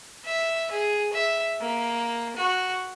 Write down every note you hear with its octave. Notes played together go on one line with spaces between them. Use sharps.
E5
G#4
E5
A#3
F#4